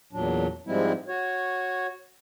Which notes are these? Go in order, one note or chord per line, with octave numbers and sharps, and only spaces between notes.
E2 A#2 F#3 D4
G#2 F3 G3 G#3 C4 E4
F#4 C#5